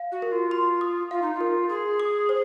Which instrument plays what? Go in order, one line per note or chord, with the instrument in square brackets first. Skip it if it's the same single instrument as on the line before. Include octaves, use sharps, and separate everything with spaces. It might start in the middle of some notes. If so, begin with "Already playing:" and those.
Already playing: [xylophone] F5
[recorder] F#4
[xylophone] A#4
[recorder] F4
[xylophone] C6
D#6
[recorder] F4 [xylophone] F5
[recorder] D#4
F4
[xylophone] A#4
[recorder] G#4 [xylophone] C6
[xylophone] D#6
C5